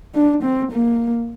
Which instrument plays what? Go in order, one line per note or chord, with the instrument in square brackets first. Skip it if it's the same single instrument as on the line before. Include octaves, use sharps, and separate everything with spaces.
[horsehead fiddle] D4
C4
A#3